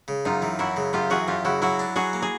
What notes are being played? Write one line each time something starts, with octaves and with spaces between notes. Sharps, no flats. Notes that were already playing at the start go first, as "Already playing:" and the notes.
C#3
F#2 D#4 F4
E3
F#2 E4 F#4
C#3
F#2 F4 G4
E3 F#4 G#4
F#2 F4 G4
C#3 E4 F#4
F#3 E4 F#4
D4
F#3 F#4 G#4
A#3
G#4